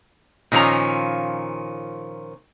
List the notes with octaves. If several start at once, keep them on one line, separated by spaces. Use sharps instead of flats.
A#2 D#3 F3 C#4 A#5